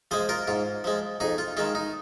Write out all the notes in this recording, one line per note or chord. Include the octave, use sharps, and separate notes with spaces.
F3 G#3 G#4 C5
F4 A#4
G#2 F4
F3 G#3
F2 D#4 G#4
F4
D#3 G#3 F4
D#4